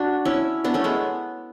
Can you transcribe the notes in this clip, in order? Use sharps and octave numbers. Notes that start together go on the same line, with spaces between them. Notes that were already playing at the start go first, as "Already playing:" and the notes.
Already playing: D4 F#4
C#4 E4
B3 D4
A3 C#4
G#3 B3